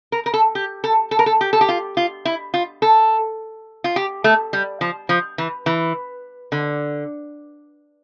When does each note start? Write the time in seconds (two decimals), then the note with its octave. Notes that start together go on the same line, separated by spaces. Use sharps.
0.12 A#4
0.26 A#4
0.34 A4
0.55 G4
0.84 A4
1.11 A4
1.19 A#4
1.26 A4
1.41 G4
1.53 A4
1.61 G4
1.69 F4
1.97 F4
2.25 E4
2.54 F4
2.82 A4
3.84 F4
3.96 G4
4.24 A3
4.53 G3
4.81 F3
5.09 F3
5.38 E3
5.66 E3
6.52 D3